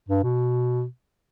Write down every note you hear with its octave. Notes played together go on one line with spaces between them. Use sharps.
G2
B2